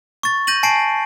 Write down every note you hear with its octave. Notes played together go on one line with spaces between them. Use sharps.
C#6 A6
G6 A#6 D#7 F#7
G#5 A5 C7 D7